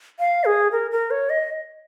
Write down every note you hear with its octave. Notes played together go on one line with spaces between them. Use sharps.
F5
G#4
A#4
A#4
C#5
D#5